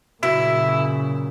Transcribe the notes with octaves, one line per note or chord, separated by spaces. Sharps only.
F#2 A#2 C#3 E4